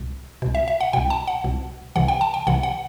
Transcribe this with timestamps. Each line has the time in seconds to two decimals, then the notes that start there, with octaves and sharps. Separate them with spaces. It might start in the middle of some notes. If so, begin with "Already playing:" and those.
Already playing: C2 B2
0.42 C2 B2
0.55 E5
0.68 E5
0.81 F#5
0.93 C2 B2 G5
1.10 A5
1.27 F#5
1.44 C2 B2
1.96 C2 C3 E3 F#5
2.08 G5
2.21 A5
2.34 G5
2.47 C2 C3 E3 F#5
2.63 F#5